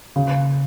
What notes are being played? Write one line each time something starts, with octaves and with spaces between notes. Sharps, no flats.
C#3